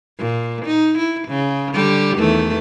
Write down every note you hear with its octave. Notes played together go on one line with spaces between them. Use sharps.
A#2
D#4
E4
C#3
D3 G3 G4
E2 D#3 A3